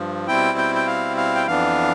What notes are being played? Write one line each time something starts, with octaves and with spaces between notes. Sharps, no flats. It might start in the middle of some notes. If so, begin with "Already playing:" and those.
Already playing: G2 F3
B2 G3 C4 E4 G5
G5
G5
F5
F5
G5
F2 E3 B3 D4 F5